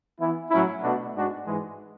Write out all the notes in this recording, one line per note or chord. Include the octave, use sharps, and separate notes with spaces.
E3 B3 E4
A2 F#3 C#4 E4
B2 A3 D4 F#4
G#2 G#3 D4 F#4
G#2 E3 G#3